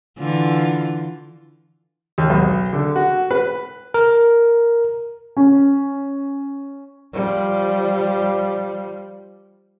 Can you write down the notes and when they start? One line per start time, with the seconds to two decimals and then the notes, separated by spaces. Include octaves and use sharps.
0.18 D3 E3 F4
2.18 D#2
2.30 B1
2.73 D3
2.96 F#4
3.31 B4
3.94 A#4
5.37 C#4
7.14 F3 G3